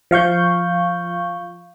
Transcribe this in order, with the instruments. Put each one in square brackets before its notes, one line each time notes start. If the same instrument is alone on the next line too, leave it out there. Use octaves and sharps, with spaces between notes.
[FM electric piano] F3 F5 C#6 G6